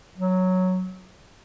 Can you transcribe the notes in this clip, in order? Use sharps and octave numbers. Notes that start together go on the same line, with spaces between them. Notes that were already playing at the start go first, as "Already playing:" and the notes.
F#3